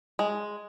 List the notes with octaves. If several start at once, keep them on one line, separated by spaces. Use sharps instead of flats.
G#3